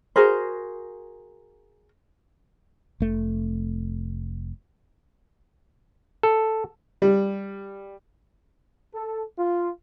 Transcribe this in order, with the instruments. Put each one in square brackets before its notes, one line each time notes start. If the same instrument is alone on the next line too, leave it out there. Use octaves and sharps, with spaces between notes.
[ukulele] F#4 G#4 A#4 C5
[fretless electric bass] F1 A3
[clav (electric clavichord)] A4
[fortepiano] G3
[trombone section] A4
F4